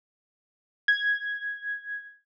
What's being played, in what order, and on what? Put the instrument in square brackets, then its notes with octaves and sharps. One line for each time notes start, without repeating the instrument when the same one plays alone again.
[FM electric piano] G#6